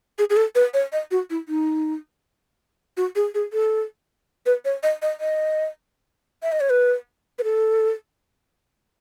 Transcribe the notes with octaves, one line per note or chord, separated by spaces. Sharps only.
G#4
G#4
A4
B4
C#5
D#5
F#4
E4
D#4
F#4
G#4
G#4
A4
B4
C#5
D#5
D#5
D#5
E5
D#5
C#5
B4
B4
A4